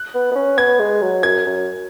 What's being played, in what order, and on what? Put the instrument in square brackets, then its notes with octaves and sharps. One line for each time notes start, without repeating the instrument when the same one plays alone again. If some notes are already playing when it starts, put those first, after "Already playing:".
Already playing: [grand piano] F#6
[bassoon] B3
B3
C#4
[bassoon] B3 [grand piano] G#6
[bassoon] G#3
F#3
[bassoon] F#2 [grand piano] G#6
[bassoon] F#2